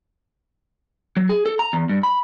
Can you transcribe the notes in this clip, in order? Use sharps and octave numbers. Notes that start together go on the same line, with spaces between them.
F#3
G#4
A4
A#5
E2
G2
B5